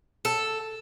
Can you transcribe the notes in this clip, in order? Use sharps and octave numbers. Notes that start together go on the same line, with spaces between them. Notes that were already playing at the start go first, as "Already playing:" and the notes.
A4